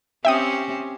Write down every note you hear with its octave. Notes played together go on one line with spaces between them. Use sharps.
C4 C#4 G4 E5 G5 D#6